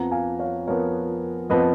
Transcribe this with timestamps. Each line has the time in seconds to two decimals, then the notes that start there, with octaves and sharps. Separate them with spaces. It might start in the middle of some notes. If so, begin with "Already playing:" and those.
Already playing: F2 F3 B3 F#5 A#5
0.11 F5 G#5
0.39 C#5 F5
0.67 F2 F3 B3 A#4 C#5
1.50 F2 F3 B3 B4 D#5